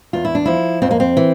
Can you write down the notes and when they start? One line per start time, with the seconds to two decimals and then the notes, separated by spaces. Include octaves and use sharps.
0.13 E2 F4
0.25 E4
0.35 D4
0.46 F3 E4
0.82 F2 C4
0.91 A#3
1.00 C4
1.17 E3